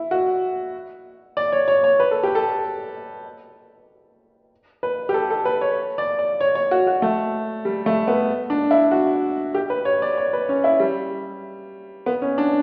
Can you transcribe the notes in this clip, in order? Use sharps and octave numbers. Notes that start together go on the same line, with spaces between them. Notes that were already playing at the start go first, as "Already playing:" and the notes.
Already playing: E4
F#4
D5
C#5
C#5
C#5
B4
A4
G4
A4
B4
G4
A4
A4
B4
C#5
D5
D5
C#5
C#5
F#4
F#4
A3
G3
A3
B3
D4
E4
F#4
G4
B4
C#5
D5
C#5
B4
C#4
E4
G3
B3
C#4
D4